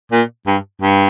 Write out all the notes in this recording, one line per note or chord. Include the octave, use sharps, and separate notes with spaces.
A#2
G2
G2